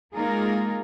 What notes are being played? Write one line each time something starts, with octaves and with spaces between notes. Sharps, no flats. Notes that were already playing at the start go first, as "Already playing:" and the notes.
G#3 A#3 D#4 F4 G#4 A#4